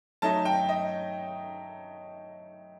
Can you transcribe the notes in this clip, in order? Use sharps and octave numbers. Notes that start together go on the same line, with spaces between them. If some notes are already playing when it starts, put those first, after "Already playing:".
F#3 A3 D#4 A5
G5
D#5